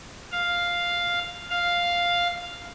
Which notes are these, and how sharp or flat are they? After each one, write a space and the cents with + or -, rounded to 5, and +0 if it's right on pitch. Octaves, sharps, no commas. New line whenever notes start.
F5 +0
F5 +0